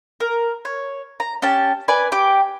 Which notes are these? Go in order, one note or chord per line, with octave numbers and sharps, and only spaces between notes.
A#4
C#5
A#5
C#4 G4 A5
B4 D5 G#5
G4 D6